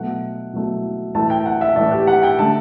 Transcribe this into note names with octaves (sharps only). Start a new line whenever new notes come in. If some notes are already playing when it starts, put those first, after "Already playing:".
Already playing: B2 F#3 A3 F#5
B2 F#3 A3
A2 E3 A3 A5
G5
F#5
E5
A2 E3 A3 D5
G4
F#5
G5
D3 A3 A5